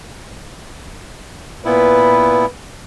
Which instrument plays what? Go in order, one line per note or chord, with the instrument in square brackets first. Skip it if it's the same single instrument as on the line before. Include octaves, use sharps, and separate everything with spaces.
[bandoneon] A#2 B3 E4 [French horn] B4